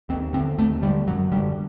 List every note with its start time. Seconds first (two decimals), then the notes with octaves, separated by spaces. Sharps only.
0.09 D#2 C4
0.33 D3 C4
0.58 D#2 A3
0.82 D3 G3
1.07 F#2 F#3
1.32 D3 G3